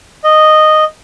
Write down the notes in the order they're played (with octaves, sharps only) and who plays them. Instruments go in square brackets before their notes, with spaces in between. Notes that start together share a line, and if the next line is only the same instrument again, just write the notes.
[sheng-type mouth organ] D#5